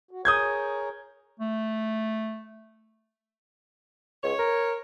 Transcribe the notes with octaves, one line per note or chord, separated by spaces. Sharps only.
F#4
G#4 A#4 C#5 D#6 G6 G#6
A3
C#2 C#5
A#4